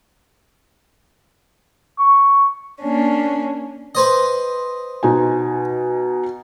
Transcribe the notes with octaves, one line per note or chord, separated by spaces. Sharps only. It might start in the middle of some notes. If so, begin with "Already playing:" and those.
C#6
A#3 C#4 D4
B4 C5 D#5
B2 D#4 G#5